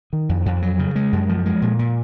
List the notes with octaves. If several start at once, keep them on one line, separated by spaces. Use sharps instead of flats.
D#3
F2
F2
F#3
C#3
G#3
F#2
F3
G#3
A#2
A#2